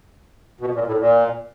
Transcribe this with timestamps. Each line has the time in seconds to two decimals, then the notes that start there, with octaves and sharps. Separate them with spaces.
0.61 B2
0.75 A#2
0.87 A2
1.00 A#2